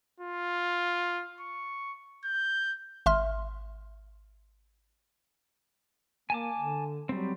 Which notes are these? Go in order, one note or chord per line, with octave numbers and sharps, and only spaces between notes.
F4
C#6
G6
G#1 E5 C6 F6
A#3 G#5 A5 D6
D3
F#3 G3 C4